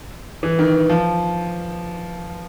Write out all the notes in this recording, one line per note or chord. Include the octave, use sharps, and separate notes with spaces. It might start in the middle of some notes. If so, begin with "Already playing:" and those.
E3
D#3
F3